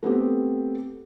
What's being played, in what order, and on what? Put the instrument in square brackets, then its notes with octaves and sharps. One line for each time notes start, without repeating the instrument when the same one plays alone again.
[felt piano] A3 B3 C4 G4